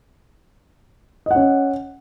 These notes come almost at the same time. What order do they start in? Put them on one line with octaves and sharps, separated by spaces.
D#5 F#5 C#4